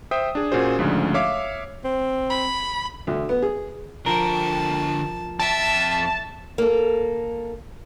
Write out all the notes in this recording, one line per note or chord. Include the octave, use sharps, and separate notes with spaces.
C5 E5 G5 D#6
D4 G#4
A#2 A#3 C#4 F#4 G#4 C5
D2 G#2 C#3 F3 D4
C#5 E5 F5 D6
C4
B5
D2
B3
G#4
D3 F3 A#4 G5 A5
F2 E5 G5 A5
A#3 A4